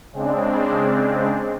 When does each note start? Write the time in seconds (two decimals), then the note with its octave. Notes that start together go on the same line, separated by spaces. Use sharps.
0.13 C#3 G#3 C4 D4